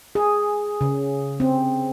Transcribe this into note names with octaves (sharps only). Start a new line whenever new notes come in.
G#4
C#3
C4